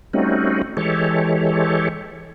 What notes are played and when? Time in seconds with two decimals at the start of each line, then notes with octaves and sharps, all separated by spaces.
0.13 G3 A3 C4 C#4 D#4 F#4
0.77 E3 G#3 G4 A4 C#5